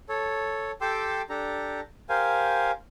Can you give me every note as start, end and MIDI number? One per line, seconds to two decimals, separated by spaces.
0.09 0.71 69
0.09 0.71 73
0.81 1.22 67
0.81 1.22 69
0.81 1.22 79
0.81 1.22 84
0.81 1.22 86
0.81 1.22 88
1.29 1.80 62
1.29 1.80 67
1.29 1.80 69
1.29 1.80 82
2.09 2.71 67
2.09 2.71 70
2.09 2.71 72
2.09 2.71 77
2.09 2.71 80